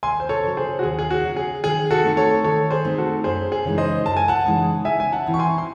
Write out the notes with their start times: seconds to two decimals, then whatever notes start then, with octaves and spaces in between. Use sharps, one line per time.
0.03 D#2 G#5 C6
0.20 C5
0.29 A4 C#5
0.43 C#3 F#3
0.57 G#4 C5
0.79 F#4
0.83 D#2 G#4
0.99 G#4
1.11 F#4
1.23 C#3 F#3
1.37 G#4
1.64 D#3 G#4
1.91 F#4 A4
2.04 A3 C4 D#4
2.17 A4 C#5
2.44 D#3 A4 C#5
2.71 G#4 C5
2.85 A3 C4 D#4
2.98 F#4 A4
3.24 F#2 G#4 C5
3.52 G#4
3.65 C#3 E3 G#3 D#4
3.78 C5 D#5
4.05 F#2 A5
4.17 G#5
4.28 F#5 A5
4.45 C#3 E3 G#3 D#4
4.85 C#3 E5 G#5
5.00 G#5
5.12 F#5 A5
5.26 E3 C4 E4
5.34 C#6
5.39 G#5 C6
5.58 C6